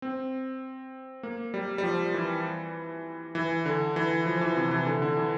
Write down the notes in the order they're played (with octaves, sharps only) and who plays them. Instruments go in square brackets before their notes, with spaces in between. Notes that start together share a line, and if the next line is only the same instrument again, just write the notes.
[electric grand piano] C4
A#3
G3
G3
F3
E3
E3
D3
E3
F3
E3
C3
E3
D3
D3
E3